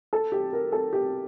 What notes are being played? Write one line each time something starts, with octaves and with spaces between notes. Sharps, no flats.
A4
G4
A#4
A4
G4